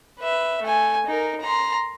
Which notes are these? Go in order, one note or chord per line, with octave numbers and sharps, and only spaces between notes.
B4 E5
A3 G#5
D#4 A#4
A#5 C6